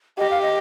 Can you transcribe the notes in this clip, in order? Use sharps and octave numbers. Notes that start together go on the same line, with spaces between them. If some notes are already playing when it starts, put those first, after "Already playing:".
G4 D#5
F5
D#5